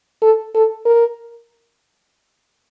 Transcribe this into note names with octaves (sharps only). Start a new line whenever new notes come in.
A4
A4
A#4